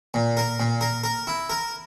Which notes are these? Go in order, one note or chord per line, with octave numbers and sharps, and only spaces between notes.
A#2
A#4
A#2
A#4
A#4
E4
A#4